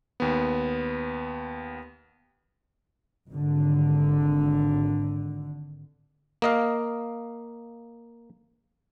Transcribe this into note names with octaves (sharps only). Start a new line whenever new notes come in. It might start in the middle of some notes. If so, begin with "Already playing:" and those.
D#2 B3
G#1 D3
A#3 D#5 F5